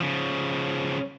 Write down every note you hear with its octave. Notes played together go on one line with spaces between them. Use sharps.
C#3 F3